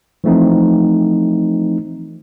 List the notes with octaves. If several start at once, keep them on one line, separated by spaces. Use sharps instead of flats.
E3 F3 A3 C4 D#4